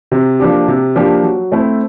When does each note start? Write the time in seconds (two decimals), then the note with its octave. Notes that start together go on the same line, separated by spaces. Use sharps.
0.12 C3
0.40 F3 A#3 D4 G4
0.68 C3
0.96 F3 A#3 D4 G4
1.23 F#3
1.52 A3 C4 E4